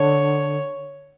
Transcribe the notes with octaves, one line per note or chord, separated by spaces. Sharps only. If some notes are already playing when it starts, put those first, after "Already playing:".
Already playing: D3 C#5